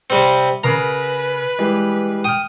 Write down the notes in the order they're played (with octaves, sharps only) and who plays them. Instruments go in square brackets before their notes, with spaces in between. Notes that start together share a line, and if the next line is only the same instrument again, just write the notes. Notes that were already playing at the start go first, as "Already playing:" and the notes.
[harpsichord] C3 G3 C4
[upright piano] C#3 A#4 C7 [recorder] B4 [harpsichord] A#5
[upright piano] E3 G3 G#3
[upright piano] G5 F6 [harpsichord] D#6